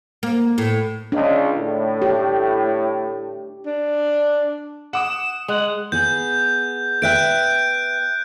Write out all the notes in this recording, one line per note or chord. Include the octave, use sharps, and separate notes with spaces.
A#3
A2
C#2 D4
A2
G4
D4
F#5 D6 D#6 E7
G#3 F#5
B3 G#4 G6
B4 E5 G5 F#6 G6 D7